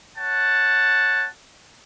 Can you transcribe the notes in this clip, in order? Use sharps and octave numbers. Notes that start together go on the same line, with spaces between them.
C#5 F#5 A5